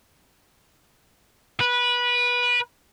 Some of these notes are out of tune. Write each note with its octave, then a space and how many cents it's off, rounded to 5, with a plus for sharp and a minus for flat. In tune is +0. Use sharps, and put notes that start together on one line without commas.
B4 -20